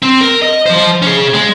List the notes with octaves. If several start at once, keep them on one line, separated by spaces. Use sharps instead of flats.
C4
A#4
D#5
F3 C5
C#4 G#4
G#3